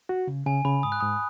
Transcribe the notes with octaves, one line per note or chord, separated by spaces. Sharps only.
F#4
C#3
C#3 G#5
C#3 B5
G#2 D#6
F#6
G#2 D#6